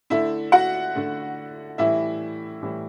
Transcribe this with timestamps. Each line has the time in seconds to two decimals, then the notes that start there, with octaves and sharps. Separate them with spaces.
0.10 D3 A3 E4 E5
0.52 F#4 F#5
0.95 D3 A3
1.78 A2 E3 G3 E4 E5
2.62 A2 E3 G3